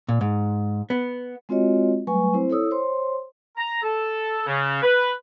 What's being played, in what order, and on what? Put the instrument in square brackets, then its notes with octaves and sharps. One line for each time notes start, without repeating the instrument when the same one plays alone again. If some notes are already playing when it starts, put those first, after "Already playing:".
[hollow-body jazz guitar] A#2
G#2
B3
[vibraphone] G#3 C4 F4 F#4 C#5 D#5
F#3 G3 A3 B4 G#5 C#6
C4 E4 C5
E4 A4 C#5 D#6 E6
C5 C#5 C6
[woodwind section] A#5
A4
C#3
B4